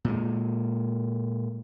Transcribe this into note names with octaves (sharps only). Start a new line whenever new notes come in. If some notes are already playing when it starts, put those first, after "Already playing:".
A#2 G#3